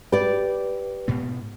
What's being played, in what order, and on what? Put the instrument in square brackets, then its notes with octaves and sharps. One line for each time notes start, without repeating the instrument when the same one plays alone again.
[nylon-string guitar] G4 D5 [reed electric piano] B4
[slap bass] G#2 B2 B3